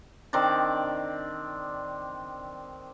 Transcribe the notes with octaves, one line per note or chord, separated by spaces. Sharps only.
D#3 C4 D4 D5